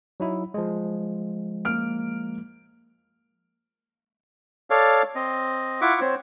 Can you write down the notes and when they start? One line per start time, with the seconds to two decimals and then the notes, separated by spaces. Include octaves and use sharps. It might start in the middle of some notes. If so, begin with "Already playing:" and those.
0.20 F#3 D#4 E4
0.54 F3 G#3
1.65 A#3 F6 D7
4.70 A4 C#5 D5 F5
5.15 C4 D#5
5.81 E4 F4 E5 F#5 C#6 D6
6.01 C4 C5 C#5